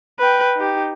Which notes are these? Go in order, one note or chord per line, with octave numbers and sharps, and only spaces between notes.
B4 G5
D#4 G4